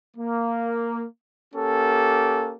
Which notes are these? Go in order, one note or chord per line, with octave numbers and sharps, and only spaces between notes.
A#3
A#3 C#4 G4 A4